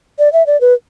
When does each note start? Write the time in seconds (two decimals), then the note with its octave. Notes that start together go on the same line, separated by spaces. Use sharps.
0.19 D5
0.33 E5
0.47 D5
0.61 B4